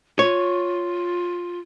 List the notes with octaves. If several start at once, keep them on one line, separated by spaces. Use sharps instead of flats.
F4 C#5